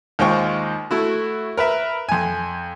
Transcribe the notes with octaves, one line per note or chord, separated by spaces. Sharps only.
D#2 G#3 F4 C5 G5 C#6
A3 E4 F#4
A#4 B4 E5
F2 G#5